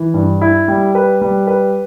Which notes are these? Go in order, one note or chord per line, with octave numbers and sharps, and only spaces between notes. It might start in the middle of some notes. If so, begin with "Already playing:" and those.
Already playing: E3
G2
E4
G3
B4
G3
B4